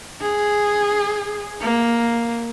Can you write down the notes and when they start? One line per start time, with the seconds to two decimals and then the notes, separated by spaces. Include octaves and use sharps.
0.21 G#4
1.61 A#3